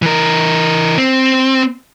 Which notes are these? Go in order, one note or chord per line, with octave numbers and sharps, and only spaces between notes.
E3 A#4
C4